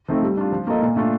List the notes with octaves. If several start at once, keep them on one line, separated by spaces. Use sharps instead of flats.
F3 A3 C4 D#4
G3
D4 F4
F3
A#3 F4 A4 D#5
A#2
A3 D4 F4